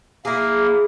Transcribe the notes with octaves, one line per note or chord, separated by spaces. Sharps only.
A#3 E4 G#4